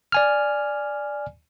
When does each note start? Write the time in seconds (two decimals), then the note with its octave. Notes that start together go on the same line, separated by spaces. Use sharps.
0.12 D5 G#5 F6